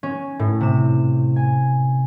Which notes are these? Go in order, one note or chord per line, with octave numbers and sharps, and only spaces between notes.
C#4
A2
C3 E7
G#5